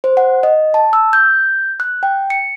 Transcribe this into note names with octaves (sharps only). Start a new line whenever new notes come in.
C5
F#5
D#5
A5
E6
G6
F#6
G5
C#7